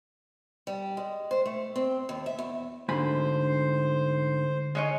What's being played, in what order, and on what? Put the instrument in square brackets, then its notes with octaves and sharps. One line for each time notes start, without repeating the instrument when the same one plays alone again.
[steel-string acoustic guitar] G3
G#3
C5
A3
C4
D#2
E5
E2
[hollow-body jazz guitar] D2 G#5 B5 [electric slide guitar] G#2 D3 [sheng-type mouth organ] C5
[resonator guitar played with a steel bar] G#3 C#5 D#5